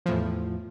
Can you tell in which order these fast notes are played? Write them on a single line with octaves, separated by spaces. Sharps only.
F3 A2 E2